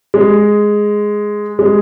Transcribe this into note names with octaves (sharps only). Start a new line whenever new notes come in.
G#3
G#3